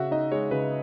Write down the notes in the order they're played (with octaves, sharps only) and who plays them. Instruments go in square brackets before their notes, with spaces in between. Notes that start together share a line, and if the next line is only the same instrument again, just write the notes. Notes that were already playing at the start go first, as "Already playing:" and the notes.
Already playing: [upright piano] C#3 F#4 [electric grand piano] E5 F#5
[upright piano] D#4 [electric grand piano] D#5
[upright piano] G#3 [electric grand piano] C#5
[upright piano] C#3 [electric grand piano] B4